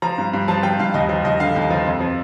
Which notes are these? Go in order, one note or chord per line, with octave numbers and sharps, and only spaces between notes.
F3 A#5
G2
G2
F3 A5
F3 G5
G2 F5
D#2 D#5
F3 D#5
D#2 D#5
D3 F5
D#2
F3
F2
F3